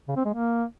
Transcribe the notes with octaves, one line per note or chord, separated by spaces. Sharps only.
C#3
C4
G#3
A#3